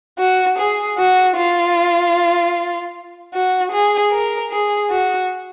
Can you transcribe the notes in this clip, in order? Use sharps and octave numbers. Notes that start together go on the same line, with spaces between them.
F#4
G#4
F#4
F4
F#4
G#4
A#4
G#4
F#4